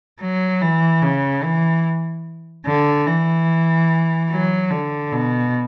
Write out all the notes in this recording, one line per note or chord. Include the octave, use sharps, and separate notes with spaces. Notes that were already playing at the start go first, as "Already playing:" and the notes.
F#3
E3
C#3
E3
D3
E3
F#3
D3
B2